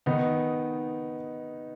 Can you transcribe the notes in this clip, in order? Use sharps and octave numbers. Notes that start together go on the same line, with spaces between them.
D#3 B3 D#4